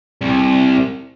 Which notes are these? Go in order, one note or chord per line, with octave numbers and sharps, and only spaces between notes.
C2